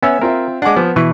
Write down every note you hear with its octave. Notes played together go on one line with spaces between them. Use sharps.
B3 C#4 E5 G#5 E6
C4 F4 A#4 E5
G#3 D4 F#5 G#5 D6
F3 B3
B2 E3 B4 C#6